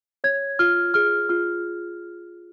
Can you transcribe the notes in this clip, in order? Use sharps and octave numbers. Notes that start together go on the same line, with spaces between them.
C#5 G#6
F4 F6
G#4 F6
F4 F6